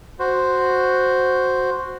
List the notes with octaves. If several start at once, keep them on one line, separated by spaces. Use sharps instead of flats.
F#4 C5